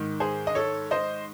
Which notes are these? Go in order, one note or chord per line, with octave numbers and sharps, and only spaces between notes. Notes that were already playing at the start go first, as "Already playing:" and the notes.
Already playing: G#2 D#3
G#4 C5
D#5
A4 C#5
C5 D#5